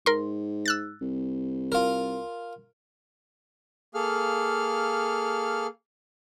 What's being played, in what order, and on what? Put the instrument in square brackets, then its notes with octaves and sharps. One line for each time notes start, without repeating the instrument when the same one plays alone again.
[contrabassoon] G#2 [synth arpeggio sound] A#4 C6
[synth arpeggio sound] E6 F#6 A6
[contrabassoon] C2
[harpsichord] F4 A#4
[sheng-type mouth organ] A#3 G#4 A4 F5 F6